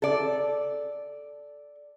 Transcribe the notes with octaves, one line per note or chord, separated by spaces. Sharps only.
A4 D5